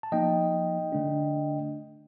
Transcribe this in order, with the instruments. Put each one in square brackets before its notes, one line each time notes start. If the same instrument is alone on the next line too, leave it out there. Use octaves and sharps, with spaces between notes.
[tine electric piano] A5
F3 A#3 D#4 D#5 G5
D3 A3 D4